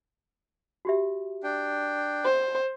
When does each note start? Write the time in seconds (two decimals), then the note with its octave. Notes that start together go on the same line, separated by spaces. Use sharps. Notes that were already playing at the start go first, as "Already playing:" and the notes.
0.85 F#4 G4 E5
1.44 D4 G5
2.24 C5